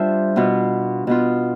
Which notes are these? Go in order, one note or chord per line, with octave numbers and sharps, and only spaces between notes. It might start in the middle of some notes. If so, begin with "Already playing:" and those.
Already playing: G3 D4 F4 C5 E5
B2 B3 F4
B2 B3 F4